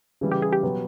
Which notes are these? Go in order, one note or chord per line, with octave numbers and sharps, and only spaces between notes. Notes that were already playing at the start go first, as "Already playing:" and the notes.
C#3 E3 G3
G4
G#4
G4
B2 F#3 B3